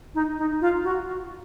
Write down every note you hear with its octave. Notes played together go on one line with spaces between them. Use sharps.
D#4
D#4
F4
F#4